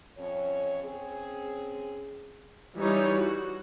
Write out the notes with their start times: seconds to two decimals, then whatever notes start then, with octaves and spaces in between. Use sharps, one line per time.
0.18 F2 C#4 C#5
0.84 C4 C#4 G#4
2.77 E3 G3 D#4 C#5
3.17 F#4